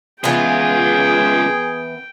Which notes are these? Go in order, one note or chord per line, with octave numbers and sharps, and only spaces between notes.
C#2 E3 B3 F4 G#4 G5